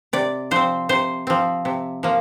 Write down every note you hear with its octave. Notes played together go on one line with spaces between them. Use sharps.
C3 D5
F3 C4 C5
C3 C5
F3 C4
C3
F3 A#3